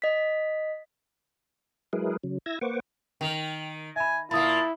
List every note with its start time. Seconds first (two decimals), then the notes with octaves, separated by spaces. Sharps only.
0.02 D#5 B6
1.93 F#3 G#3 E4 G#4 A#4 B4
2.23 C#3 F#3
2.46 E4 E6 G#6 A#6
2.61 A#3 B4 C5 F#5 C#6 D6
3.21 D#3 G5 F7 F#7
3.96 E5 G#5 B5
4.31 A#2 A#3 E4 A5 B5 D#6